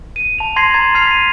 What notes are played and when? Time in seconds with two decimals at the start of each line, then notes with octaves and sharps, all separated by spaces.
0.16 D#7
0.39 A5 F7
0.56 A5 C6 G#6 A#6 C7
0.74 A#5 C6 G#6 A6
0.95 A5 F6 G#6 C7 F7
1.07 B6 D#7